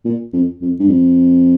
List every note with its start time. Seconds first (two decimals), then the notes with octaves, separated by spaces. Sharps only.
0.05 A#2
0.33 F2
0.61 F2
0.79 G2
0.88 F2